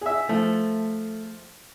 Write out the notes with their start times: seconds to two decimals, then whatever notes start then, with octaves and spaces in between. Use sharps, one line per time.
0.01 G#4 E5
0.29 F3 A3